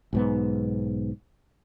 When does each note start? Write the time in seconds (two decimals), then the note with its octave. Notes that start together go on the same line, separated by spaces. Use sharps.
0.13 B1 G#2 B3